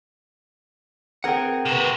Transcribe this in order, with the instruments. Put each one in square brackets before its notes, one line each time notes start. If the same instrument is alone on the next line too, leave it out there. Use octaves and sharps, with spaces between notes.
[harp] C4 G#4 A#4 [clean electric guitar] F#5 G5
[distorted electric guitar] C3 F#4 [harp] B4 E7